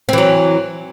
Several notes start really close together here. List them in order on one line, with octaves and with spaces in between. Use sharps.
C4 E3 F#3